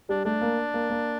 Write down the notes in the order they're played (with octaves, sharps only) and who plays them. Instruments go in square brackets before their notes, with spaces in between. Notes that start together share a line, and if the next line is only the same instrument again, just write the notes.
[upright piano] G3 [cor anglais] D4
[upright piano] A3 [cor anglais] D4
[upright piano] A#3
A#3
A#3